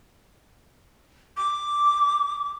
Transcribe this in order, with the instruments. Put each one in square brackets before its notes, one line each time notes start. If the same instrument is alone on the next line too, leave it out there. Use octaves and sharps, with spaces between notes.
[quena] D6